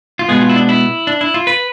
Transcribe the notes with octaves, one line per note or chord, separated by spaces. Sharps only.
F4
B2 G#3 B3 G#4
F4
E4
D4
E4
D4
E4
F4
B4